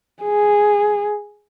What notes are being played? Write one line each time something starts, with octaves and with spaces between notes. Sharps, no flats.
G#4